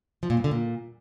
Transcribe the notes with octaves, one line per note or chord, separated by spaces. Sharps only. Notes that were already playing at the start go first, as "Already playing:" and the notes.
F3
A#2
G2
D3
A#2